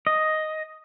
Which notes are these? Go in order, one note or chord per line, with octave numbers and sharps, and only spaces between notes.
D#5